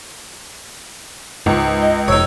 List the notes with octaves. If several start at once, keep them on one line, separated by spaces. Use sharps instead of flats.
C#2 G#2
D#5
F1 D#4 C#5 E6